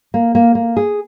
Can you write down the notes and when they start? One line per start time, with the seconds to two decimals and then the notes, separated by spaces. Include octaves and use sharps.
0.14 A#3
0.35 A#3
0.55 A#3
0.77 G#4